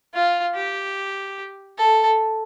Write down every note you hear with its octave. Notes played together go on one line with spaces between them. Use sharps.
F4
G4
A4